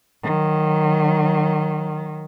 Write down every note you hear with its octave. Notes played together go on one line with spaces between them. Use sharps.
D#3 F#3